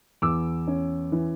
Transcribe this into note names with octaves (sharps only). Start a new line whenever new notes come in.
E2 D6 E6
C#4
E3